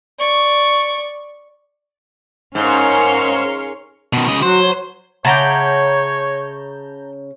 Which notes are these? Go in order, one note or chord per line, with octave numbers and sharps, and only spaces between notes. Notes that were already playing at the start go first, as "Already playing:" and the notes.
D5 C#6
G#2 C#4 A#4 C#5 F5 C6 F6
B2 D#3
C#3 D#5
F#3 F#4 C5
F#3 C#5
C#3 C#5 E5 F#5 A5 A#5 D6 G6